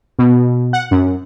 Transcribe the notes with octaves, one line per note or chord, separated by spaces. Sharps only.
B2
F#5
F#2